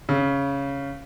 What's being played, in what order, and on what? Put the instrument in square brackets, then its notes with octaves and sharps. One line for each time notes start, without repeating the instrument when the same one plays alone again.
[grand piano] C#3